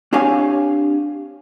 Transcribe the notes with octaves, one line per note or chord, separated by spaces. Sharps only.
C4 D4 G4 C#5 F5 G#5